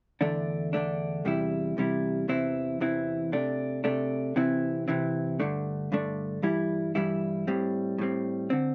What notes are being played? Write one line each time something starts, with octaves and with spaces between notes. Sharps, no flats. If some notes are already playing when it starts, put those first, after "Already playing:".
E2 D3 A3 D4
E2 D3 A3 D4
E2 C3 G3 E4
E2 C3 G3 E4
E2 C3 E3 C4 E4
E2 C3 E3 C4 E4
C3 A3 D4
C3 A3 D4
C3 E3 C4 E4
C3 E3 C4 E4
G2 D3 A3 D4
G2 D3 A3 D4
G2 E3 G3 E4
G2 E3 G3 E4
A2 G3 C4
A2 G3 C4
D3 C4